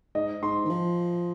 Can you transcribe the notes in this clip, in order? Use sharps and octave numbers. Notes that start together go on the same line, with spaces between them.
G#2 D#5
G#2 C6
D#3
F3